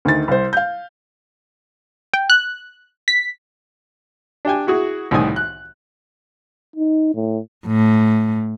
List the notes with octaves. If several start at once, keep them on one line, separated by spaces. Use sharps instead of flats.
D2 D#3 A6
C2 C5
F5 G6
G5
F#6
B6
D4 G4 G5 G#5
E4 F#4 G#4
C2 A2 D#3 G#5 D#6
F#6
D#4
A2
A2